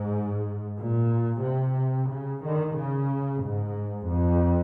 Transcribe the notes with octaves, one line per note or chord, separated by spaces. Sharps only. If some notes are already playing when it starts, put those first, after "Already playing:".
Already playing: G#2
A#2
C3
C#3
D#3
C#3
G#2
F2